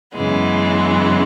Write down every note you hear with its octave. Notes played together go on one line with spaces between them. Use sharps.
F#2 C#3 E3 G#3 B3